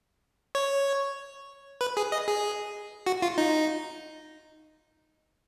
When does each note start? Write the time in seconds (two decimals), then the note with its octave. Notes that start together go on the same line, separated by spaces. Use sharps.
0.55 C#5
1.81 B4
1.97 G#4
2.12 D#5
2.28 G#4
3.06 F#4
3.22 F4
3.38 D#4